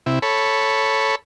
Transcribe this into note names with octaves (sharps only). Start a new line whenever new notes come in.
C3 E4
A4 C#5 B5